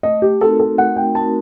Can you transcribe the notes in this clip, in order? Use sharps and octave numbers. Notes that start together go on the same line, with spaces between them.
A3 D#5
G4
C4 D#4 F#4 A4 A#4
A4
A3 F#5
G5
C4 D#4 F#4 A#4 A5